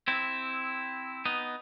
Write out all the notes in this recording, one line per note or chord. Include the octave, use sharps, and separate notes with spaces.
C4 E4
B3 D#4